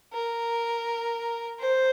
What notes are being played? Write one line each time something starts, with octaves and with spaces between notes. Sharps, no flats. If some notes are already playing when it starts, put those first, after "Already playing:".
A#4
C5